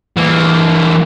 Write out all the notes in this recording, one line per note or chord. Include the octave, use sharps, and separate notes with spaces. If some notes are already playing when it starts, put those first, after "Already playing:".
E3 A#3